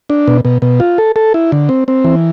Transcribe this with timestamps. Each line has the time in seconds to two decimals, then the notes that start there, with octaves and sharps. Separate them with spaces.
0.10 D4
0.28 B2
0.45 B2
0.62 B2
0.80 F4
0.98 A4
1.16 A4
1.34 E4
1.52 D3
1.69 C4
1.88 C4
2.04 E3